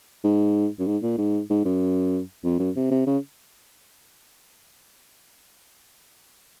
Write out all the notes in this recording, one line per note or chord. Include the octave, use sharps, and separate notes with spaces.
G#2
F#2
G#2
A#2
G#2
G#2
F#2
F2
F#2
C3
C3
C#3